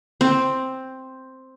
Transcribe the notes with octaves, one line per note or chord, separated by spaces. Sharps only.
C4